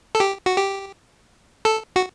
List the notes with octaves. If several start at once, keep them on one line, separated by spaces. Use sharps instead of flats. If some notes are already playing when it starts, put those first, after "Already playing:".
A4
G4
F#4
G4
A4
F#4